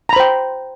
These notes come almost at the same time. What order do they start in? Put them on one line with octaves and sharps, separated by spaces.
A#5 B5 C5 G5